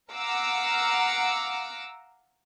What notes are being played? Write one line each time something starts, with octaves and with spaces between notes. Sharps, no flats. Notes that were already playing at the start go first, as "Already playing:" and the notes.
F5 F#5 A#5 D6 E6 F6